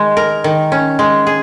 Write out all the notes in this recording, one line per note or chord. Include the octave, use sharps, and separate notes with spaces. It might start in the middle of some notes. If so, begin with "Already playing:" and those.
Already playing: D#3 G#3 D#4
A#4
D#3
C#4
G#3
G#4